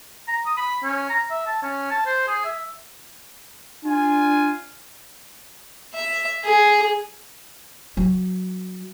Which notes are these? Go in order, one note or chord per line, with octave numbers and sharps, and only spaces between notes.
A#5
D#6
B5
C#4
A#5
E5
A5
C#4
A5
C5
G#4
E5
D4 F4 G#5
E5
G#4
F#3